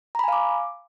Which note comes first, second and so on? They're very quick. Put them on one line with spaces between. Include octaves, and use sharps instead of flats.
A#5 B5 G#5 F5 D6